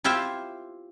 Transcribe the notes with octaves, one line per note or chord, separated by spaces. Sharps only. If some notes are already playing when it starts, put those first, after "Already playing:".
E4 F4 G4 C5 E5